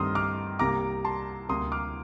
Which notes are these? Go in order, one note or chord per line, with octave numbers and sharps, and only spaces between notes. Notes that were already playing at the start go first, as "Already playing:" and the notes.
Already playing: G2 D#3 A3 C4 C6 D#6 F6
D6 F6
C2 C3 G3 A#3 A#5 D6
A5 C6
D2 C3 G3 A#3 C6 D#6
D6 F6